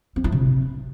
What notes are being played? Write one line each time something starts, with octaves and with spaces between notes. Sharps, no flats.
C4
E4
C3